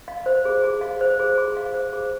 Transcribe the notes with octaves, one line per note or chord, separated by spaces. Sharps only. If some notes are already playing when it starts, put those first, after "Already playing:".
F5
C5
G#4
G#4
F5
C5
G#4
G#4
F5
C5
G#4